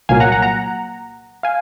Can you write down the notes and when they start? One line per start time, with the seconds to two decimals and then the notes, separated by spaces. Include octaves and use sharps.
0.09 C2 A#2 F#3 A#3 F5 G#5
0.20 F#5 A#5
0.32 F#5 A#5
0.42 F#5 A#5
1.43 F5 G#5